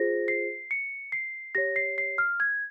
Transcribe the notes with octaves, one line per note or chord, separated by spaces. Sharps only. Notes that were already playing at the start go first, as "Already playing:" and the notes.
Already playing: F4 G#4 C5 A#6
C7
C#7
C7
G4 C#5 A#6
C7
C7
F6
G#6